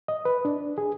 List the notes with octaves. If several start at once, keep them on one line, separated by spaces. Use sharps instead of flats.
D#5
B4
D4
G#4